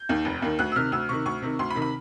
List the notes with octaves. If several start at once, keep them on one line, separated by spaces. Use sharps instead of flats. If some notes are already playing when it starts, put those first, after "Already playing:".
Already playing: G6
D#2 D#3
F1
D#2 D#3
D2 F#6
E6
C3 D#3 F6
D2 E6
C3 D#3 C#6
D2 C#6
C3 D#3
D2 C6
B5
C3 D#3
B5